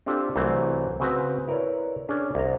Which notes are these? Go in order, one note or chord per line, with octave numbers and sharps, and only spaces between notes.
C4 D4 F4 G4 A4
C2 E3 F#3 A3 C4
C#3 C4 F#4 G#4 B4
E4 A#4 B4 C#5 D5
C#4 D4 G#4 D5
C2 A#5